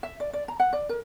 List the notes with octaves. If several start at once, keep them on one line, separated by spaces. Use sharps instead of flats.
E5
D5
D5
A#5
F#5
D5
A#4